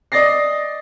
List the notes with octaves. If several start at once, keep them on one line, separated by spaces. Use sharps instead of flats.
D5 D#5 A6 A#6 C7